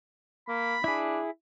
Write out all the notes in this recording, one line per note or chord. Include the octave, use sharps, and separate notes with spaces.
A#3 B5
D4 E4 G#4